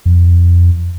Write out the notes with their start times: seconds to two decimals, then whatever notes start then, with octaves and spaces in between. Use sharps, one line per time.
0.05 F2